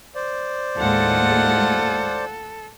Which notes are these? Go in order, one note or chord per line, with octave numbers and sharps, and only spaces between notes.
C5 D5
D#2 A2 G#3 F4 A4 F#5